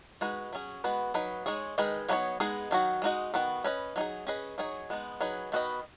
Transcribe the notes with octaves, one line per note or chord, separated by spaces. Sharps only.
G#3 D#4 F#4 B4
F#3 C#4 G#4
G#3 B3 F#4 B4
F#3 D#4 B4
G#3 D#4 G#4 C#5
D#3 G#3 D#4 G#4 B4
F#3 B3 D#4 F#4 C#5
G#3 B3 D#4 G#4
D#3 F#3 D#4 F#4
G#3 D#4 F#4 D#5
D#3 B3 F#4
C#4 B4 D#5
F#3 D#4 G#4
C#4 G#4 B4 D#5
F#3 D#4 G#4 C#5
G#3 B3 D#4
F#3 D#4 G#4 B4
D#3 B3 F#4 B4 D#5